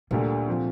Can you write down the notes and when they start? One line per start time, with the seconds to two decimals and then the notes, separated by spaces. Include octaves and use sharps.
0.11 D2 A#2 D3 G3 A#3
0.48 C3 F3